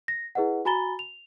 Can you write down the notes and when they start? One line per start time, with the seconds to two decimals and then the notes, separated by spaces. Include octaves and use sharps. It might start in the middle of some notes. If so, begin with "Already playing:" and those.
0.08 A#6
0.35 E4 G#4 B4 D#5 F#5
0.65 F#4 G#5 A#5 B5 A6 G7
0.99 F7